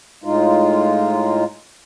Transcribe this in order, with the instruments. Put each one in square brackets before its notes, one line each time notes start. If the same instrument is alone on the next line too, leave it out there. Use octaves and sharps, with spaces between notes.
[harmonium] A2 G#3 D#4 F4